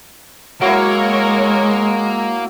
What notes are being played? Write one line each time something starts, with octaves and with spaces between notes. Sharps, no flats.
F#3 G#3 A#3 E4 A#4 C#5